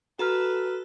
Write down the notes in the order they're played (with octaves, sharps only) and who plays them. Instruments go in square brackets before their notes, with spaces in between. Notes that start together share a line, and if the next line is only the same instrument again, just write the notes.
[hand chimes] F#4 A#5 F6 [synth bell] A4 [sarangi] B4